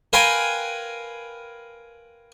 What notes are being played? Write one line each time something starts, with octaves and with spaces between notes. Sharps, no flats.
A#4 B4 F5 G5 G#5 C6